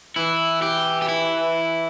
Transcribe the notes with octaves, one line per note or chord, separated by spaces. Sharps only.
E3 E4
G4
G4
E4